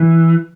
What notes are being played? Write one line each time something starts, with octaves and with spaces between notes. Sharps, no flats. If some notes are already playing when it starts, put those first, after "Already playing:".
Already playing: E3